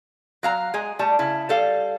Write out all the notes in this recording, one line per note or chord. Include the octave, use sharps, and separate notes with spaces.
F#3 F5 A#5
G#3 G#4
G3 A3 A5
C#3 E4
G3 A4 F5